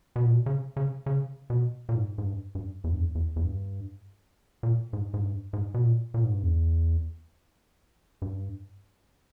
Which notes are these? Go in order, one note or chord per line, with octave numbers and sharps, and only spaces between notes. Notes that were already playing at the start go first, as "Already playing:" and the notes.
B2
A#2
B2
C#3
C#3
C#3
B2
A#2
G#2
G#2
G2
G2
E2
G2
E2
E2
E2
G2
A#2
G#2
G#2
G2
G#2
B2
A#2
A#2
G#2
G2
E2
G2